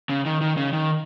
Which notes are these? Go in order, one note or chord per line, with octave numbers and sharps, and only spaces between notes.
C#3
D#3
D#3
C#3
D#3